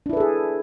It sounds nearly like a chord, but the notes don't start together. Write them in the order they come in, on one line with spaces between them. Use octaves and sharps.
D4 E4 B4 A4 G#4